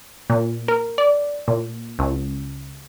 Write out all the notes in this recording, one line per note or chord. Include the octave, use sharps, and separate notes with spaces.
A#2
A#4
D5
A#2
C#2